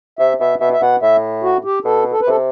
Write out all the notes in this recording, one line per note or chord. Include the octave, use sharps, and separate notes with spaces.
C3 E5
B2 E5
B2 E5
E5
B2 F#5
A2 E5
F#4
G4
B2 A4
A4
B4
C3 A4